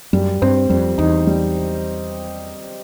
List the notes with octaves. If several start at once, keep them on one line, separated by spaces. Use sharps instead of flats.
F#2 G3
G2 C4
F2 G3
E2 D#4
G3